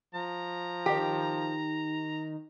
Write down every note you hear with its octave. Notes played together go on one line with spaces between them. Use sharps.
F3 A#5
D#3 G4